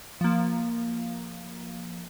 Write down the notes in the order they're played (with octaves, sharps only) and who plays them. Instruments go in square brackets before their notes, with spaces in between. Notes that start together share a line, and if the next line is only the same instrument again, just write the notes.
[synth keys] F3 A#3